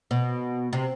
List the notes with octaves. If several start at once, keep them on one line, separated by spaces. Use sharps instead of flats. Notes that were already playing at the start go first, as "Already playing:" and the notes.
B2
C3